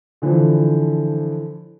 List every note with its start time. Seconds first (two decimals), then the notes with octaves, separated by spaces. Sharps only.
0.22 D3 E3 F3